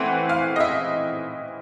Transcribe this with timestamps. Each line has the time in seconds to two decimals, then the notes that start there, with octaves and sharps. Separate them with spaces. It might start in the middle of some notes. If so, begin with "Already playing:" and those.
Already playing: E3 A3 C4 F#5
0.29 F5
0.56 D#5
0.60 E5